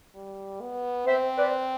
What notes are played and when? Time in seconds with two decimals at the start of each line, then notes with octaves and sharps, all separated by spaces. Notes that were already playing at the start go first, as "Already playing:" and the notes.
0.15 G3
0.61 B3
1.07 C4 C5 E5
1.38 B4 D5